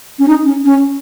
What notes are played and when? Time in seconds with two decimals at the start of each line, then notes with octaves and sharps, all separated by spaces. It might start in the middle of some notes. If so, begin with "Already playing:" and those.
0.19 C#4
0.28 D#4
0.46 C#4
0.65 C#4